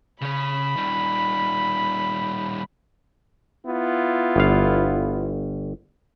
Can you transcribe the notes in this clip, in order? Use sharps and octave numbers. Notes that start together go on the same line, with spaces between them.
C#3 C#5 B5
D#3 G3
B3 E4 F4
G1 F5